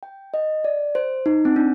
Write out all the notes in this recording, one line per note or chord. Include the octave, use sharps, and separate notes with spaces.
G5
D#5
D5
C5
D#4
C4
D4